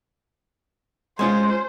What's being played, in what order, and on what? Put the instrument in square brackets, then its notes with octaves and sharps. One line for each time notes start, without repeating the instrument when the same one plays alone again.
[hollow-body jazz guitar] G#3 C#4 F4 [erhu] C5